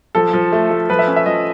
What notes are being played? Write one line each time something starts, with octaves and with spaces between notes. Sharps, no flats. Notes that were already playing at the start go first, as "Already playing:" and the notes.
F3 A4
F3
A3
A3
F3 B4
E5
C#4
E5
F3 D#5